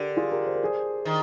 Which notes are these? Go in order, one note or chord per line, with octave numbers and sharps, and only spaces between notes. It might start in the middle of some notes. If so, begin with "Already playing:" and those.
Already playing: D3 G4 A#4
F4 G#4
G4 A#4
C5
A#4
G#4 C5
D#3